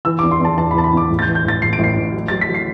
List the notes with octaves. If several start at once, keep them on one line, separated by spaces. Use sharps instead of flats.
E3 E6
D6
E2
C6
E2 A5
E2 A5
B5
E3 A5
B5
E2 D6
A1
A6
G6
E3
G6
A1 A6
A1 C7
D7
A1 C7
A1
F#3
F#3 A6
B6
F#3
C7